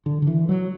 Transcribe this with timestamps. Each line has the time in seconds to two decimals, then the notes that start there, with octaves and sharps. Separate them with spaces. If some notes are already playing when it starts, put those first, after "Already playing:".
0.06 D3
0.22 D3
0.27 E3
0.49 F#3